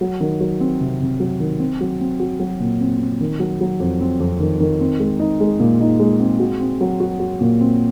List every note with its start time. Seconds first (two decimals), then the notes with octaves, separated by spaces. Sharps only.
0.01 F#3
0.20 D#3
0.40 F#3
0.60 C4
0.81 C3
1.00 C3
1.20 F#3
1.40 D#3
1.60 C4
1.80 F#3
2.01 C4
2.20 F#4
2.40 F#3
2.60 A#2
2.81 C4
3.00 C4
3.21 D#3
3.39 F#3
3.61 F#3
3.80 F2
4.01 C4
4.20 F2
4.40 D#3
4.60 D#3
4.81 C4
4.99 G#3
5.19 D#4
5.40 G#3
5.60 A#2
5.80 D#4
5.99 G#3
6.20 C4
6.39 F#4
6.60 C4
6.81 F#3
7.00 F#4
7.20 F#4
7.41 A#2
7.61 C4